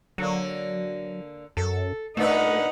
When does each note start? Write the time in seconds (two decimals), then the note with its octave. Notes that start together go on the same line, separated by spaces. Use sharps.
0.18 D3 F#3 A#3
1.57 F#2 A4
2.17 A#2 A3 D4 D#4 B4 F#5